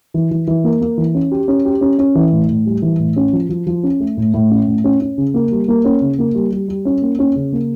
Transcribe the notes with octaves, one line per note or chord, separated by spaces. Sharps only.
E3
E3
E3
A#3
A#3
E3
C#4
G4
C#4
G4
C#4
C#4
E3
A2
A2
G3
E3
A2
C#4
F3
F3
F3
C#4
A3
A2
A2
C#4
A2
C#4
C#4
C#3
A#3
G3
A#3
C#4
C#3
A#3
G3
G3
G3
C#4
A#3
C#4
C#3
A#3